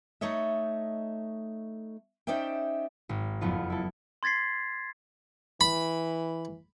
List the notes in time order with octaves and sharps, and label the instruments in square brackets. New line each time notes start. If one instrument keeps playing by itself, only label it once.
[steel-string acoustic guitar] A3 D#4 C#5 D#5 E5
C#4 D#4 C5 D5 E5 G5
[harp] G#1
F#1 F2 B3 F4
E4 A4
[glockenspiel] C6 G#6 A6 B6 C7
[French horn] E3 [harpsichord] B5